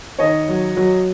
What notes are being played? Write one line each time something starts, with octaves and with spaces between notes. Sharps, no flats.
D#3 C#5 D#5
F#3
F#3